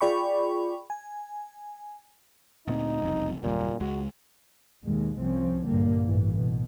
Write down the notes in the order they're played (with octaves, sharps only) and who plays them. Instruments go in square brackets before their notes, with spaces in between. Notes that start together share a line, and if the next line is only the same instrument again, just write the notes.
[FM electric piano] F4 G#4 D5 G5 B5 C#6
G#5
[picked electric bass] D2 A#2 C4 [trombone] D#4
[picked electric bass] F#1 C2 F2
[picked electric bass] F#1 D#2 G3 [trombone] A#2
[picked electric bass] C#2 G#3 [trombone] F#4
[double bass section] D#2 B2 G#3
C2 F3 C4 C#4
A#1 G2 A#2 D3 G3 A#3
A1 G2 E3
B2